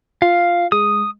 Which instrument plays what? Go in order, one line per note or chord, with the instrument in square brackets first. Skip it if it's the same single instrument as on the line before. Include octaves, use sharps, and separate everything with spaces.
[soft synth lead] F4 [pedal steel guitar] F5
[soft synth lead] G#3 [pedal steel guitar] D#6